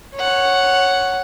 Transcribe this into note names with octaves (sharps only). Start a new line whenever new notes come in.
C#5 F#5